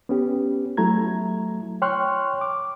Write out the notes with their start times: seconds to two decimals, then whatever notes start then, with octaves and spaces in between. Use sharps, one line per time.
0.09 B3 C#4 G4
0.77 F#3 A3 E4 A#5 G#6
1.82 C#5 G5 C6 C#6 F6 F#6
2.41 D6